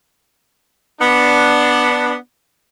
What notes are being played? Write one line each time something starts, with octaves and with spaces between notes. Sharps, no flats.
B3 D4